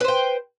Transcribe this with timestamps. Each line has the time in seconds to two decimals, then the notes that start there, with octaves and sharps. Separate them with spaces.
0.01 B4
0.04 C5
0.08 G5